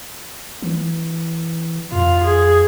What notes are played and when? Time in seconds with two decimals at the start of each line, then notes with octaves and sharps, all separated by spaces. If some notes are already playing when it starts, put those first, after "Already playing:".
0.62 E3
1.92 F2 F4
2.25 G#4